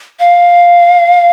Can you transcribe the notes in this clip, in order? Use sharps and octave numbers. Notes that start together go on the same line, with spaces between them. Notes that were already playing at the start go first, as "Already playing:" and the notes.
F5